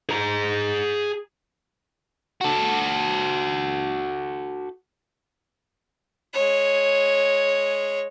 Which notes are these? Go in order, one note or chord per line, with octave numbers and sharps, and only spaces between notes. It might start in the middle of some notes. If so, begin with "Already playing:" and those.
G#4 A#5
F#4 A4
G#3 C#5